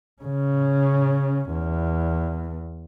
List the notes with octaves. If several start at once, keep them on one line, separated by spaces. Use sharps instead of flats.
C#3 C#4
E2